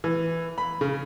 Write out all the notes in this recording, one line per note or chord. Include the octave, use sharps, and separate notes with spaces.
E3
B5
C#3